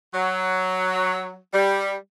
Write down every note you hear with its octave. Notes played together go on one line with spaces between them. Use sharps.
F#3
G3